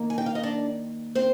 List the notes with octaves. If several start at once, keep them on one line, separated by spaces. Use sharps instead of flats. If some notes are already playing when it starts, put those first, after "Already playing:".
Already playing: D#3 A#3
G#5
G5
F5
D#5
D4 D5
C4 C5